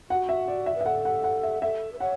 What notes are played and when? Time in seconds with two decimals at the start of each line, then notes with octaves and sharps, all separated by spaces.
0.10 F#4 F#5
0.29 E5
0.48 D5
0.66 E5
0.75 B4
0.81 E5
0.86 A4 F#5
1.05 F#5
1.24 F#5
1.43 E5
1.62 A4 E5
1.93 B4
2.00 C#5 F#5